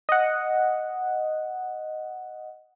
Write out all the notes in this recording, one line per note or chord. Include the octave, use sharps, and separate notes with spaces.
D#5 F#5